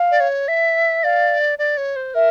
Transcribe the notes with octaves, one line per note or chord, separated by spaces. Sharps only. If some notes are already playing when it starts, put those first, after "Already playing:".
Already playing: F5
D5
C#5
E5
D5 F5
D5
C#5
C5
A#4 E5